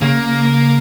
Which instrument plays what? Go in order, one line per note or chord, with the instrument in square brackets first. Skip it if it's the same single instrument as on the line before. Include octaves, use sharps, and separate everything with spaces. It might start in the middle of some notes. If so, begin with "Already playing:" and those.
[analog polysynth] C#3 [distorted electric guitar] A#3